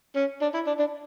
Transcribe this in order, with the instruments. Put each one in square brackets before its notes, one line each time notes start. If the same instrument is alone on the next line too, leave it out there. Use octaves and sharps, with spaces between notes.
[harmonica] C#4
D4
E4
D4
D4